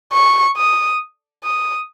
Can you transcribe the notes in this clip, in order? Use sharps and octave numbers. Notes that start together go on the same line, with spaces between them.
C#6
D#6
D#6